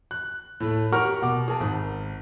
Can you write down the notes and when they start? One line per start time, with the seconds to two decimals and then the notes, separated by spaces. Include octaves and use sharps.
0.11 F#6
0.60 A2 A3
0.92 G4 A#4 F#5 A#5 C#6 F6
1.22 B2 F#5 D6
1.48 G#4 A#4 A5
1.60 G#1